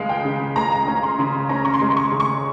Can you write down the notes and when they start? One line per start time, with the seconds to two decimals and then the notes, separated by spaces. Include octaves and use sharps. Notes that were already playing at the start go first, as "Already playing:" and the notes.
Already playing: C#2 G#3 F5
0.09 G5
0.25 C#3
0.56 C#2 A#5
0.87 C#4
1.03 C6
1.19 C#3
1.49 C#4 A#5
1.65 C#6
1.74 C6
1.81 G#3
1.97 C#6
2.11 C#3
2.20 C#6